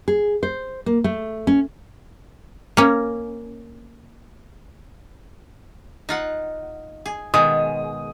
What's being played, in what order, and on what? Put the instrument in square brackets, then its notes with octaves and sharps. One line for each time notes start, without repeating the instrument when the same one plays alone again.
[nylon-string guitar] G#4
C5
A#3
A3
C#4
[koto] A#3 C#4
D#4 F4 F#5
G#4
[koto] B2 D#3 G#3 [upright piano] D#6